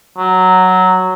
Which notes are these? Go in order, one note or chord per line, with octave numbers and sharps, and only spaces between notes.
F#3